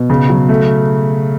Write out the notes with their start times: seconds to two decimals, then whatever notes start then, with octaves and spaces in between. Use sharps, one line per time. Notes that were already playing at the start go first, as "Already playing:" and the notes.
Already playing: B2
0.10 C#3
0.29 F#3
0.49 A3